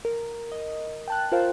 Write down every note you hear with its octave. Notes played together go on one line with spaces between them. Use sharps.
A#4
D#5
G5 A5 F#6
F4 A#4 C5 F5 G5